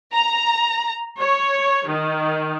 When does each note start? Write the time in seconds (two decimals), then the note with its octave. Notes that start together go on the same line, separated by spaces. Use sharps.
0.12 A#5
1.19 C#5
1.88 D#3